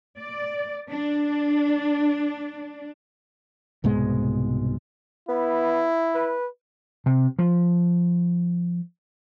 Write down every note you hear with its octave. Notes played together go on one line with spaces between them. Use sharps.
D5
D4
C2 G#2 B2 G#3
B3 E4
B4
C3
F3